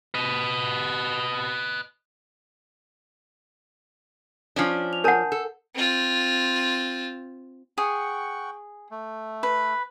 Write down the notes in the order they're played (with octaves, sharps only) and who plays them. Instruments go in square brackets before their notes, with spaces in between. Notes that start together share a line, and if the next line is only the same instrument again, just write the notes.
[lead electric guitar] B4 D#5
[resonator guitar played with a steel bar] F3 C#4 D4
[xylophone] F7
[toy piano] A#4 F#5 [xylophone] G#5 A5 G6
[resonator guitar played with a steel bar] A4
[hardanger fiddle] C4 F4
[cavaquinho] G#4 [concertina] F#5 G5 C#6
[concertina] A3
[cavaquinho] B4